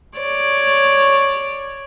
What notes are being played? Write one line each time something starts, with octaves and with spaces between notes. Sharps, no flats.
C#5 D5